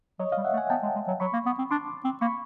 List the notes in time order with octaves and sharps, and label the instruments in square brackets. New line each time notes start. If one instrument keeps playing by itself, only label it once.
[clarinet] F#3 [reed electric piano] C#5 D#5
[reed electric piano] D#5 F5
[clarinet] G3
[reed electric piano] E5 F#5
[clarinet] A3
[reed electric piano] F#5 G#5
[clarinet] B3 [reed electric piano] G5 A5
[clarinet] G#3
G#3
F#3
[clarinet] F#3 [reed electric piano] B5 C#6
[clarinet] A#3
B3
C4
[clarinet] D4 [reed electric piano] C6 D6
[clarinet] C4
[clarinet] A#3 [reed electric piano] B5 C#6